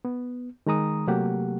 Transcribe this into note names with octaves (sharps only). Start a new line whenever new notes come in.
B3
D#3 G#3 A#5 D#6
C3 F#3 A3 A#3 G4 F#5